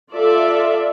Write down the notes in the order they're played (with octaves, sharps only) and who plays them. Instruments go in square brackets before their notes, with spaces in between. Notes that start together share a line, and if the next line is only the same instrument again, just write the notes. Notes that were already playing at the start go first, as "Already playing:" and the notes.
[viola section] F4 A4 D5 E5